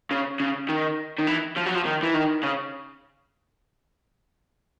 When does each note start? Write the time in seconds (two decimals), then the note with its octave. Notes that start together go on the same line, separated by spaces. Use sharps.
0.11 C#3
0.40 C#3
0.69 D#3
1.18 D#3
1.27 E3
1.56 F3
1.66 F#3
1.75 F3
1.85 D#3
2.03 E3
2.14 D#3
2.43 C#3